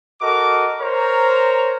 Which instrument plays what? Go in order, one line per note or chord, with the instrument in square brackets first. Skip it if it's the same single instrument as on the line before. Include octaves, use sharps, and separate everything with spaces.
[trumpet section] F#4 A4 A#4 D#5 D6
A#4 C5 C#5 A#5